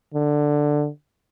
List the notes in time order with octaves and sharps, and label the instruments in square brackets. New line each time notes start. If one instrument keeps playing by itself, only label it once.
[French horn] D3